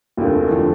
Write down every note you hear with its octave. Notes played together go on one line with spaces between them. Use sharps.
F1 D#2 D3 F3 A3
D3 F3 A3